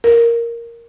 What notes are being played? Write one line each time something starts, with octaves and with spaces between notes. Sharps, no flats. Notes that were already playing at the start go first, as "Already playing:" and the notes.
A#4